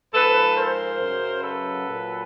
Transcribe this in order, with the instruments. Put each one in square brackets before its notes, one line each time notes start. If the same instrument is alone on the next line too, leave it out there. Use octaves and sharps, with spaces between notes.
[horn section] G#2 F3 A4 B4
A#4 C5
F#2 C#3 F#3
A4 B4
A#2 F#3